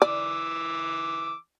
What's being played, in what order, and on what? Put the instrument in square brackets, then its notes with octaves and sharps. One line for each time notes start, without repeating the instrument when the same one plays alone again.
[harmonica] E3 D6 E6 [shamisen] D5